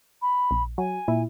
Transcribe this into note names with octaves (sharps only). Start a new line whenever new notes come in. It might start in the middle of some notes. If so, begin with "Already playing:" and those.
B5
A#1
F#3 G#5
A#2 E4